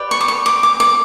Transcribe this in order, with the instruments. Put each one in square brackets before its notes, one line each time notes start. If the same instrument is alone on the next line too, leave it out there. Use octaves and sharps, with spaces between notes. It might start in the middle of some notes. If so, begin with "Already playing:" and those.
Already playing: [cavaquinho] G4 B4 D5
C#6
D6
C#6
D6
D6
D6